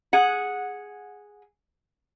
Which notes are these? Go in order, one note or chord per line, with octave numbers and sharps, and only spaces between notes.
G#4 F#5